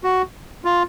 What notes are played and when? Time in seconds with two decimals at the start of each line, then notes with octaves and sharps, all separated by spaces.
0.04 F#4
0.65 F4